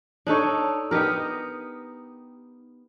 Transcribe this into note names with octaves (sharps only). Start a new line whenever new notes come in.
D4 D#4 A4 C#5
B3 D#4 G4 A#4